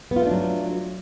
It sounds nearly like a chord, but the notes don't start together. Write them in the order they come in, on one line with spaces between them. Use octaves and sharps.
B3 F4 A3 D4 F#3